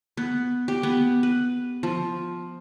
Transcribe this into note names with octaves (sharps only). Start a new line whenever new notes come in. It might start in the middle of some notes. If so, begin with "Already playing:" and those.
B3
G4
B3
B4
F3